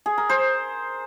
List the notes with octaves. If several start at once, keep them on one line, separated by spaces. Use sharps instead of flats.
G#4
A#4
C5